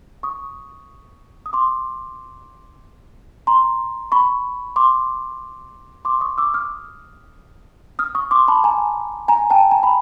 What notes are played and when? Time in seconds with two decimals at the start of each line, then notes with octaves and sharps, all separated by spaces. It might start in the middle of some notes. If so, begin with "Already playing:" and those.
0.23 C#6 D#6
1.46 D#6
1.53 C6 D6
3.47 A#5 C6
4.12 B5 C#6
4.76 C6 D6
6.05 C6 D6
6.21 C#6 D#6
6.38 D6 E6
6.54 D#6 F6
7.99 D#6 F6
8.15 C#6 D#6
8.31 C6 D6
8.48 A5 B5
8.64 G#5 A#5
9.28 G#5 A#5
9.50 G5 A5
9.71 G#5 A#5
9.83 B5